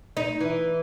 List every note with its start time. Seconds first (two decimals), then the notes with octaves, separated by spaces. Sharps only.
0.17 D#4
0.40 E3